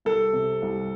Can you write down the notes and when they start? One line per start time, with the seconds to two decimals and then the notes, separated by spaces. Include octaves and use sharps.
0.05 C2 A4
0.33 C3
0.62 C2